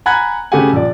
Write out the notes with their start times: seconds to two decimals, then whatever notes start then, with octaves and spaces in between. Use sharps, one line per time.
0.06 F#5 G#5 A#5 B5 F#6 G#6
0.52 C#3 A3 F#4 G4 F#5 G#5
0.73 A#1 D5